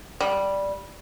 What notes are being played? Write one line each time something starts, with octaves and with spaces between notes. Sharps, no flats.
G3